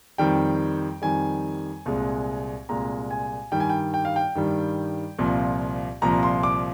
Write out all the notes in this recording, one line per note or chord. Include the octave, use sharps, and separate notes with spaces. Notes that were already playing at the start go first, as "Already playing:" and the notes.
F2 D#3 G3 G5
F2 D#3 G3 G#5
C2 A#2 G#3
C2 A#2 G#3 A#5
G#5
G2 D#3 G3 G5
G#5
G5
G5
F5
G5
G2 D#3 G3
C2 A#2 F3
C2 A#2 F3 A#5
C6
D6